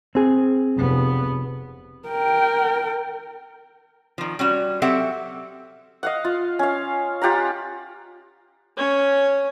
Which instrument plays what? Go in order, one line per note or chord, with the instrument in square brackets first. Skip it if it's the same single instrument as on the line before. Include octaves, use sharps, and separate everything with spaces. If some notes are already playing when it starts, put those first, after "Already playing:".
[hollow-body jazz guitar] C4 G#4
[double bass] F1 B3
[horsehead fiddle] A#4 G5
[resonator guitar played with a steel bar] D#3 F3
G3 C#4 F#4
F#3 C4 G4 A4 E5 F#5
[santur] D#5 F5 F#5
F4
C#4 F5
F4 G4 F#5 A#5
[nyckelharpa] C#4 C#5